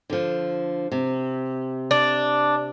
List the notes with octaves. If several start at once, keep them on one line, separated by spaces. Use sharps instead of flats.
D3 F3
C3
D4